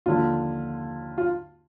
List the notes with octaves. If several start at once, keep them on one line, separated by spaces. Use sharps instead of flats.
D#2 D3 F3 F4
F4